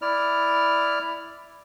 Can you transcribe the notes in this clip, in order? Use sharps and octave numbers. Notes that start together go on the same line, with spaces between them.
E4 D5 F6